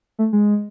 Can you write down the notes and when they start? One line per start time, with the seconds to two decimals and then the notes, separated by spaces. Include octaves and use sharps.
0.19 A3
0.33 G#3